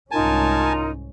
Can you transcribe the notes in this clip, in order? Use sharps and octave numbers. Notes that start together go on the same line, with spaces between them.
C2 G#2 C#4 D#4 F4 A#4 G#5 A5